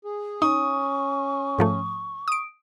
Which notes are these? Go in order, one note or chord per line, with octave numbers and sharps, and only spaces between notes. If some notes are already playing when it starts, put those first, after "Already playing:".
G#4
C#4 D#4 C#6 D#6
G#2 F3 A3
D#6 D7